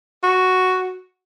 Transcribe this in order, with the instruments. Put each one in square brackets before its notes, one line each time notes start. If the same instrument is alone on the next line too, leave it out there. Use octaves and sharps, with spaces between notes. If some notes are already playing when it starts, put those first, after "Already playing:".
[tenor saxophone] F#4